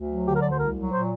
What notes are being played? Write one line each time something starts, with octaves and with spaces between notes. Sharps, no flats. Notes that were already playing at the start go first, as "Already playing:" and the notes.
Already playing: D2
F#3
D3 G4
A#4
D2 D5
C5
C2 A#4
F#3
A#2 C5